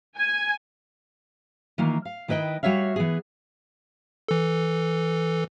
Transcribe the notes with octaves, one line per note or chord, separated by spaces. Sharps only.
G#5
D#3 E3 A#3 F4
F5
D#3 E4 B4 D#5 G5
G3 F#4 C#5 E5 F5
E3 B3 G#4
E3 A4